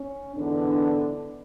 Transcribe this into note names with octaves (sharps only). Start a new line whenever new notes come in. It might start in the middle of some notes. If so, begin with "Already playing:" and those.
Already playing: C#4
G#2 D3 E3 B3 D4